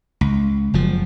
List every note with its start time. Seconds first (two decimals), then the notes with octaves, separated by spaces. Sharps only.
0.21 C#2
0.74 F#1 F3